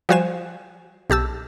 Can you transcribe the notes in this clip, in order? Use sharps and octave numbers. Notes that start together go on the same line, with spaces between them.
F3 G3 F#4 C5 G#5 E7
B1 G4 A5 E6